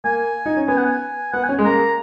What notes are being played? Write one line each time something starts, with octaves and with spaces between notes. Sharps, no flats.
A#3 G#5
D#4
C#4
B3 G#5
F#5
G#5
B3 F#5
G#5
C#4
G#3
A#3 A#5